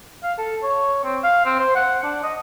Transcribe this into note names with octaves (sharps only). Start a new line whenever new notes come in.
F5
A4
C#5
C4
F5
C4
C5
F#5
D4
D#5